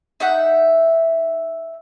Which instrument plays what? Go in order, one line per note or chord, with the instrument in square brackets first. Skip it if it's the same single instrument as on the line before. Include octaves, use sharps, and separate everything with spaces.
[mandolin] D#4 E5 F#5